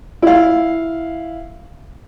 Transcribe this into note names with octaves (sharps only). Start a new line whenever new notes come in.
E4 F5